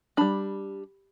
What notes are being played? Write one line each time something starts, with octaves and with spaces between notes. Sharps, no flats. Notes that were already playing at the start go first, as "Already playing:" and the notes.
G3 D4 B5